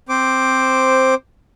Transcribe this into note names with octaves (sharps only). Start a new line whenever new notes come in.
C4 C5 D6